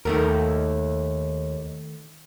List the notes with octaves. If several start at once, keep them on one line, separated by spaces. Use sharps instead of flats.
D#2 D#3 A3 A#4